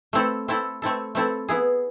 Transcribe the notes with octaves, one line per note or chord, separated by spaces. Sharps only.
A3 C4 E4 A4
A3 C4 E4 A4
A3 C4 E4 A4
A3 C4 E4 A4
B3 E4 G#4